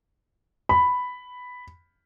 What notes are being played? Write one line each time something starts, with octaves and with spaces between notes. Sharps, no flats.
B5